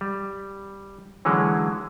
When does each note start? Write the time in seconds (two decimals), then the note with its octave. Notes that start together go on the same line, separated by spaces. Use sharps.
0.01 G3
1.25 D3 E3 F#3 G#3 C#4